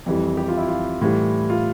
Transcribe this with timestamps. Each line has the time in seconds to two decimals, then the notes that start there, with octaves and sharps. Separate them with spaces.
0.06 F2 E3 G3
0.37 G4
0.48 F4
0.57 E4
0.68 F4
1.01 A2 E3 G3
1.50 F4